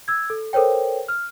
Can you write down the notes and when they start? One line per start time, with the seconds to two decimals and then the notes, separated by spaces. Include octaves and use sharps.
0.08 E6 G#6
0.30 A4
0.53 A4 A#4 C5 C#5 G5
1.08 F6